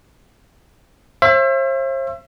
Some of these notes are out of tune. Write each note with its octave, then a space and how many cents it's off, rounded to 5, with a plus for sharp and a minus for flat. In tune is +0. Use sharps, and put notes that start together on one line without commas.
C5 +40 E5 +35